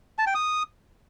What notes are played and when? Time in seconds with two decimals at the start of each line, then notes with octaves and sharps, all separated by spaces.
0.18 A5
0.27 G5
0.35 D#6